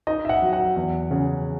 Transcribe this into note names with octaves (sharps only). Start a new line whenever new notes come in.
D#4 D#5
E5
F#5
F#3
F#5
E2
C#3